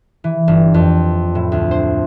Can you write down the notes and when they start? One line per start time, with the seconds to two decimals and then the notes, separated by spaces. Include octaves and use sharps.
0.24 E3
0.48 G1
0.74 F2
1.35 A2
1.52 D2
1.71 C5